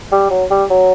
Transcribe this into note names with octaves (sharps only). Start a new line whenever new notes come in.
G3
F#3
G3
F#3